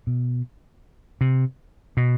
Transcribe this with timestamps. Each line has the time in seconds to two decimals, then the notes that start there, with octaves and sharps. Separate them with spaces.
0.07 B2
1.21 C3
1.97 B2